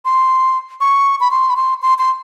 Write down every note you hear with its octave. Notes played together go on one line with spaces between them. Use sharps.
C6
C#6
B5
C6
B5
C6
C6
C6